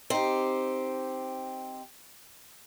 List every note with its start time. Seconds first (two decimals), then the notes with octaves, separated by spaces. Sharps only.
0.10 C4 D#4 G4